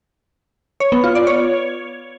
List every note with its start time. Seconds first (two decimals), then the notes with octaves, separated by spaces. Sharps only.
0.80 C#5
0.92 B3
1.04 F4
1.15 D5
1.27 C#5